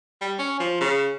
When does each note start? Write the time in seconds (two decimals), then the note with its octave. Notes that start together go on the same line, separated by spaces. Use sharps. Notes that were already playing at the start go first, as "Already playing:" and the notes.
0.21 G3
0.38 C#4
0.60 F3
0.80 C#3